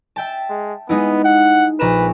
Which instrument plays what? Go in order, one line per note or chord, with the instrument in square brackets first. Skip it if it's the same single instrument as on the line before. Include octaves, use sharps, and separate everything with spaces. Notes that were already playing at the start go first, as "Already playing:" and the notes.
[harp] E5 G5 A5
[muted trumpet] G#3
[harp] G#3 D#4 E4 [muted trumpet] B3
[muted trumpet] F#5
[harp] A#1 A#5 E7 [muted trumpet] B4